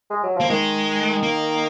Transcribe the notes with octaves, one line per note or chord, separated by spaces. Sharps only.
G#3
F#3
F3 A#3
D#3 G#3
A#3